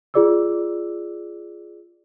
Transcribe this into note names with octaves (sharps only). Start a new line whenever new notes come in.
F4 G#4 D5 D6 E6